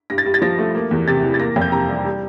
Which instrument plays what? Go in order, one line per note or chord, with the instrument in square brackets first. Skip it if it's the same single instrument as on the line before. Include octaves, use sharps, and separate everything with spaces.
[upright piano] G2 A#6
A6
G2
A6
F3 A#6
A3
A#3
E2
C3 A6
E3
A6
A#3 A#6
F2
G6
C3 A#5
G3
G3